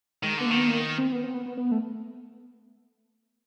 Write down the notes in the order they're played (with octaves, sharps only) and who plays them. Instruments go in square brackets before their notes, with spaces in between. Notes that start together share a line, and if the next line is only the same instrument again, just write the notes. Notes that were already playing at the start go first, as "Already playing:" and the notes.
[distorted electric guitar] D#3 [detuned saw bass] G#3
[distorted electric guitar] D3 [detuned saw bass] B3
[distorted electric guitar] D#3 [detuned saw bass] A#3
[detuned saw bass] B3
A#3
C4
B3
C4
B3
B3
B3
A3